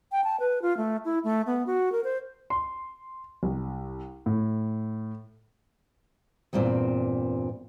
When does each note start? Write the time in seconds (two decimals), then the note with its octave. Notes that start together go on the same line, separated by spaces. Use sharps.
0.12 G5
0.24 A5
0.40 B4
0.62 F4
0.77 A3
1.05 E4
1.24 A3
1.46 B3
1.67 F#4
1.92 A#4
2.04 C5
2.50 C6
3.43 C2
4.26 A2
6.53 E2 G2 A#2 C4 D5